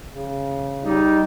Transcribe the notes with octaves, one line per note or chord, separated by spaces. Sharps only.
C#3
G3 D#4